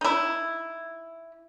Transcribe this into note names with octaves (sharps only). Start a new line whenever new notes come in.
D#4 E4